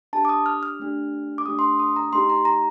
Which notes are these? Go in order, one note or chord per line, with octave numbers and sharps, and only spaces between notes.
D4 G4 A5
D6
D#6
F6
F6
A3 D4 G4
D6
A3 D4 G4 D#6
C6
D6
D#6
A#5
A3 D#4 G4 C6
A#5
A#5